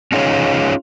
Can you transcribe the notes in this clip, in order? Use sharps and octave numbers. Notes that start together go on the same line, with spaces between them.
C#4 D#4 F4 G#4 C#5